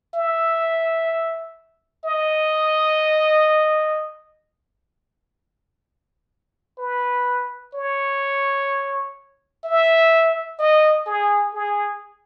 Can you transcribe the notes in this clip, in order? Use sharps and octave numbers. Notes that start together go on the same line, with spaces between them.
E5
D#5
B4
C#5
E5
D#5
G#4
G#4